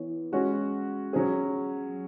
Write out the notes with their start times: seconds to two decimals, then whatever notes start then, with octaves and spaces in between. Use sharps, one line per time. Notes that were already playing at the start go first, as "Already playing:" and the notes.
Already playing: E3 B3 C#5
0.32 G#3 C#4 F#4
1.13 F#3 C#4 G#4